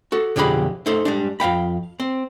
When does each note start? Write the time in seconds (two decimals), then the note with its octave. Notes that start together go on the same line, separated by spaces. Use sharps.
0.12 F#4 A4
0.36 B1 F2 D3 G4 G#4 B5
0.86 A3 D#4 A4 C5
1.05 G3 G#3 D4
1.40 F2 F5 G5 B5
2.00 C4